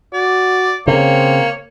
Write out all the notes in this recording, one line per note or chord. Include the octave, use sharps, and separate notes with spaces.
F#4 D5
C#3 A#3 C4 C#5